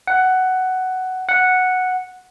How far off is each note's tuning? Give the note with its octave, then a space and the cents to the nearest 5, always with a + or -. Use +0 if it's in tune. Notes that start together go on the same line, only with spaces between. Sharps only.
F#5 +10
F#5 -5